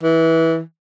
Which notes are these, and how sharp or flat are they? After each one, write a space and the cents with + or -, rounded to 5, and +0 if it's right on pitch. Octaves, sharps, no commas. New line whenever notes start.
E3 -20